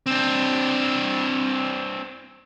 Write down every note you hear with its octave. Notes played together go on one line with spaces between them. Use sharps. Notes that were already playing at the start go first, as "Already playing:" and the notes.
C4 D4